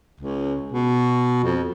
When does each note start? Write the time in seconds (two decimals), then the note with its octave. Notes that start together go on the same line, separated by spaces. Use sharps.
0.20 C#2
0.72 B2
1.44 F2